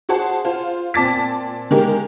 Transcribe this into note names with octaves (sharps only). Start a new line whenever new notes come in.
F#4 G#4 C5 F#5 A5
F4 C5
A#2 C4 A5 D6 A6 B6
D#3 G#3 A#3 D#4 G4 A#4